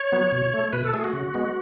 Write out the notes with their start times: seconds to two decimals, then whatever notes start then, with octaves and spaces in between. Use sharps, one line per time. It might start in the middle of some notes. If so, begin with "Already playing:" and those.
Already playing: C#5
0.12 F#3 B3
0.32 B2
0.54 A3
0.73 B2 B4
0.84 A4
0.94 A3 G#4
1.04 F#4
1.13 C#3
1.34 G#3 B3